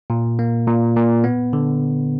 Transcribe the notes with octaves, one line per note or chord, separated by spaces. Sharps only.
A#2
A#3
A#2
A#2
B3
D3